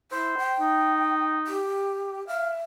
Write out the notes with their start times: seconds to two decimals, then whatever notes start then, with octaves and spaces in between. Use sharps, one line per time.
0.12 E4 C5
0.38 G5
0.60 D#4
1.47 G4
2.27 E5 F5